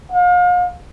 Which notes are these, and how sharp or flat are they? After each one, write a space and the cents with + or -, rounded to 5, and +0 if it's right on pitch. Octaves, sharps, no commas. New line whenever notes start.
F5 +40